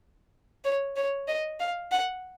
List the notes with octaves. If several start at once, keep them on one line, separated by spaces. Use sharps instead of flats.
C#5
C#5
D#5
F5
F#5